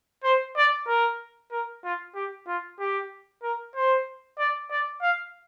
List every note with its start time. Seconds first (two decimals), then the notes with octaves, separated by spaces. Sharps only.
0.23 C5
0.56 D5
0.87 A#4
1.52 A#4
1.84 F4
2.15 G4
2.47 F4
2.79 G4
3.43 A#4
3.75 C5
4.38 D5
4.71 D5
5.02 F5